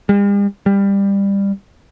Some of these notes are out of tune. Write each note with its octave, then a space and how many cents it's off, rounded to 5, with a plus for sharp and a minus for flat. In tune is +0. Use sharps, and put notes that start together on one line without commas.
G3 +45
G3 +20